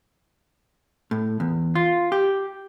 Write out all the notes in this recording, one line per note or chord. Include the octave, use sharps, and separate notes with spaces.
A2
E2
F4
G4